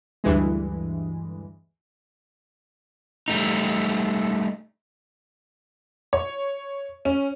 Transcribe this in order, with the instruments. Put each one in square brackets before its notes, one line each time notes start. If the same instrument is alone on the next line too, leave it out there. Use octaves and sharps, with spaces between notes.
[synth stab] D2 G2 E3 G#3
[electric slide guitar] G3 A3 D#4
[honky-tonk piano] C#5
C#4